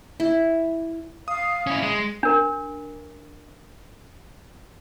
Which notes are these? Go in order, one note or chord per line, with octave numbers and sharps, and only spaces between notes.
E4
F5 D#6
C#4 E4
G#3
D4 A#4